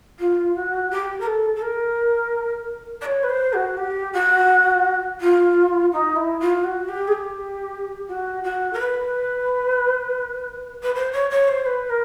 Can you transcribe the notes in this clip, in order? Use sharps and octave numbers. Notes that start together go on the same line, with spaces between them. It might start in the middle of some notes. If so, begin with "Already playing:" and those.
F4
F#4
G4
A#4
A4
A4
A#4
D5
C#5
B4
C5
F#4
G4
F#4
F4
D#4
E4
F4
F#4
G4
G#4
G4
F#4
F#4
A#4
B4
B4
C5
C#5
C#5
C5
B4
A#4